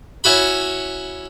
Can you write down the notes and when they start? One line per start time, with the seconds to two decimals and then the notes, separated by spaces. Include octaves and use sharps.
0.24 C#4 E4 F#4 B5